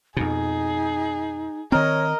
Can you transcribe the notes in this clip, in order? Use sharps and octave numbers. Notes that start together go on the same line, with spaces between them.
F2 B2 D#4 G#4
D#3 C4 A#4 C#5 D#5